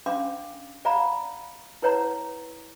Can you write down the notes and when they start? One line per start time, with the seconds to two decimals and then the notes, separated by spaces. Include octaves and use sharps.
0.06 C#4 D4 F5 C6 D6
0.85 D5 F5 F#5 A#5 B5
1.82 E4 B4 C#5 F#5 A#5